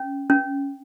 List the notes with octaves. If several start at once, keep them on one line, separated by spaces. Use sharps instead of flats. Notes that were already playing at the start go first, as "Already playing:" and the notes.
Already playing: C#4
C#4